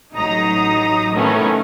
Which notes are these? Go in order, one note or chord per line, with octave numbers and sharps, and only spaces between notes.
A1 F#3 D#4 A#5 D#6 A#6
C3 D#3 E3 A3 B3 C#4